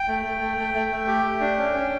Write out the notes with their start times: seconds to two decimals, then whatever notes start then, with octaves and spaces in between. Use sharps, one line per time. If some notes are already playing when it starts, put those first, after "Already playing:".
Already playing: G5
0.08 A3
0.26 A3
0.41 A3
0.58 A3
0.74 A3
0.91 A3
1.07 G4
1.24 A3
1.40 D4
1.57 C#4
1.74 C#4